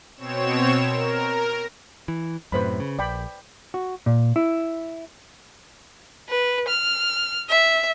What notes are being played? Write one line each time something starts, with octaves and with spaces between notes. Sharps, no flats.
B2 C4 C#5 E7
A#4
E3
F#2 A2 C3 B4 C5 B5
C#3
A#1 D5 G5 B5
F#4
A#2
E4
B4
F6
E5